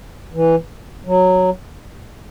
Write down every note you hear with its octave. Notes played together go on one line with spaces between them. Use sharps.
E3
F#3